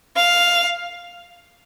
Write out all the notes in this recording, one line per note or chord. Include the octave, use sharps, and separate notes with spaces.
F5